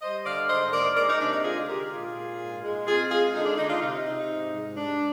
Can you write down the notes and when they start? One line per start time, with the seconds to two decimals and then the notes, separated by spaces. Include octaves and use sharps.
0.02 G3 C5 D#5
0.26 D3 D5 F5
0.49 G#2 C5 D#5
0.73 A#3 A#4 D5
0.96 G#3 A#4 D5
1.09 D#4
1.21 C3 D4
1.32 D#4
1.44 D3 F4 G#4
1.68 G#3 G4 A#4
1.92 A#2 F4 G#4
2.15 A#2
2.40 G#2
2.63 G#3
2.87 C4 F4 G#4
3.11 G#3 F4 G#4
3.34 D3 D#4
3.46 D4
3.58 D3 D#4
3.69 D4 F4
3.81 C3 D#4
4.05 C3
4.29 G#2
4.53 G#2
4.77 G2 D4